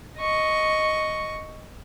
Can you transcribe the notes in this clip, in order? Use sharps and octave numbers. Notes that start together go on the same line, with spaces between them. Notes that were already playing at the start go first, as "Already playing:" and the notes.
D#5 C#6